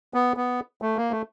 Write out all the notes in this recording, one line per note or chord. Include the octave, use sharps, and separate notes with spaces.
B3
B3
A3
A#3
A3